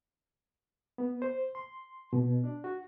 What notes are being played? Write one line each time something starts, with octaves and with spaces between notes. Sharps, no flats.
B3
C5
C6
B2
D4
F#4